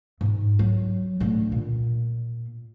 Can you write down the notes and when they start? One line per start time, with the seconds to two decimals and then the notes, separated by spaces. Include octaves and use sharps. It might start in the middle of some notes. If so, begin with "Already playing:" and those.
0.21 G#2
0.59 F#3
1.20 A2 D3
1.52 A#2